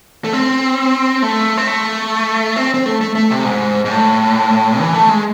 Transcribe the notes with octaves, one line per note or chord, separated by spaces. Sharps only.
A3
C4
A3
C4
A3
C4
C4
A3
A3
A3
C3
G#2
G#2
A2
E3
A3
G#3